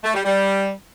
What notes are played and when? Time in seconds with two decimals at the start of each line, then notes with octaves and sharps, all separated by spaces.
0.03 A3
0.14 G3
0.25 G3